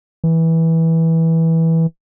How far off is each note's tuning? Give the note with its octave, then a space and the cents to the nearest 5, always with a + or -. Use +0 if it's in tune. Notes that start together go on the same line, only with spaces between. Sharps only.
E3 -15